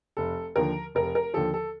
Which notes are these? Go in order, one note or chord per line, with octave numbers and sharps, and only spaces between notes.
F1 A4
D#2 D3 F3 A#4
F1 A#4
A#4
D#2 D3 F3 A4
A4